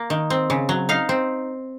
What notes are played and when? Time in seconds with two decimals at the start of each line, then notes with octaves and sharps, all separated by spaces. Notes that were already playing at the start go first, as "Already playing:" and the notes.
Already playing: A#3
0.10 D#3
0.30 C4
0.50 C#3
0.69 F#3
0.89 D#4 F5
1.09 C4